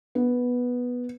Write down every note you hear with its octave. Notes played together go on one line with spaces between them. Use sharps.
B3